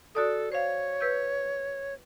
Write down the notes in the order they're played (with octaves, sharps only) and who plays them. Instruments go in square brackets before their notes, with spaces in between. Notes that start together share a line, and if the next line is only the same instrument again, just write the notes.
[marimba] F#4 D5 D#6 [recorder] A4
[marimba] C5 F5 [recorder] C#5
[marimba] B4 E6 G6